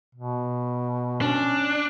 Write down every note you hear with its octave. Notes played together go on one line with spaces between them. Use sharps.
B2
C#4 D4